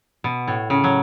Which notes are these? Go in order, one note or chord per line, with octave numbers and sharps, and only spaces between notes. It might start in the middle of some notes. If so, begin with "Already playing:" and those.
B2
A2
C#3
F#3